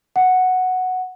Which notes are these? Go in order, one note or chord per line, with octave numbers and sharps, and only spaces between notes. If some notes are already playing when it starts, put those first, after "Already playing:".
F#5